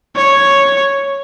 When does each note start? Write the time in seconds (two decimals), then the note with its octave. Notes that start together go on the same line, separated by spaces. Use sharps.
0.16 C#5